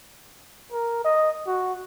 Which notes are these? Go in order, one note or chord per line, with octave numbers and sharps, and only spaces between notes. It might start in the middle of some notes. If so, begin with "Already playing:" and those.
A#4
D#5
F#4